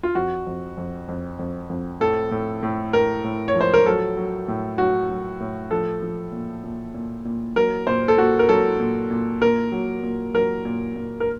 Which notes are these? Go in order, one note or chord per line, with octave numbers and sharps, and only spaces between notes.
F4
F2 F#4
F2
F2
F2
F2
F2
A2 A4
A2
A2
A2 A#4
A2
C#5
F3
C5
A#4
F#3 A4
F#3
A2
F#3 F#4
F#3
A2
F3 A4
F3
A#2
A#2
A#2
A#2
F#3 A#4
A#2 C5
A4
A#2 F#4
A#4
F#3 A4
A#2
A#2
A#2 A#4
F#3
A#2
F#3 A#4
A#2
A#2
A#4